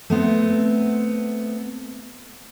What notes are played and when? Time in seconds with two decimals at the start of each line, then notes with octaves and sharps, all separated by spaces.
0.10 A3 B3 C4